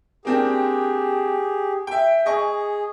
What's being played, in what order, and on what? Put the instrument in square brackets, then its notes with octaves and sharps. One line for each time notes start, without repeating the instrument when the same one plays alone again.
[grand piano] A#3 C4 D4 [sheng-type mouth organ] G4 G#4
[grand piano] E5 G5
[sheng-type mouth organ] G#4 [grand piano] D#5 G#5 C#6